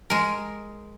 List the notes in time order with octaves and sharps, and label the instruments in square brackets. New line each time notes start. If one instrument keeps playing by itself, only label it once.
[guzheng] G#3 A#4